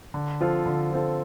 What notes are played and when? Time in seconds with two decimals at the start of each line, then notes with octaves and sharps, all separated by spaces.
0.14 D3
0.41 F3 C4 F4 A4
0.66 D3
0.92 F3 C4 F4 A4